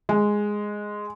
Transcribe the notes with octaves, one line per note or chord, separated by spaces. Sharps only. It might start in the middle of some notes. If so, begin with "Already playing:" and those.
G#3